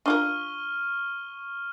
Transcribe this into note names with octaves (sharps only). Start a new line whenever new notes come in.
D4 F4 A#4 C#6 F6 G7